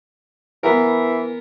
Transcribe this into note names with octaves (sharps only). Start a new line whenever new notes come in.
E3 B3 A#4